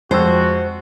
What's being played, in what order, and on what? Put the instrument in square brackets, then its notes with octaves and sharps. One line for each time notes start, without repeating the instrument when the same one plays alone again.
[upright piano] F2 G#3 E6 [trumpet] F#4 [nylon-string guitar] C5